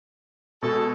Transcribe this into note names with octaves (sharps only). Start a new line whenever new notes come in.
B2 G#3 A4